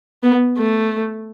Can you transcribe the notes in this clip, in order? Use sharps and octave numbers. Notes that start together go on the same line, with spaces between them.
B3
A3